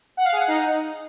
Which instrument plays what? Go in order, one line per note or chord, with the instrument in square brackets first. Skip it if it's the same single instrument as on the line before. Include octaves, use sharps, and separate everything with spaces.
[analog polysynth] F#5
F5
G#4
F#5
D#4